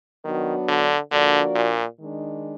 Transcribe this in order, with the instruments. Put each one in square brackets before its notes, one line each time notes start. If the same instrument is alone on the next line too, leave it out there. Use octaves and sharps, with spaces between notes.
[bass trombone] D#3 [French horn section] F#3 B3 D4 F#4
[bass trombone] D3
[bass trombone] D3 [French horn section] F3 A#3 D4 F#4 D5
[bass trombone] A#2
[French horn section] D#3 G#3 D4